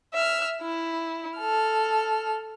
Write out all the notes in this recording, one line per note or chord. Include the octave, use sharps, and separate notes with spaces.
E5 F6
E4
A4 F6